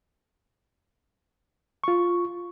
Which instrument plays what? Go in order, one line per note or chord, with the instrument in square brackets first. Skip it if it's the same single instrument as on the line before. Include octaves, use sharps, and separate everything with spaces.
[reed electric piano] F4 C#6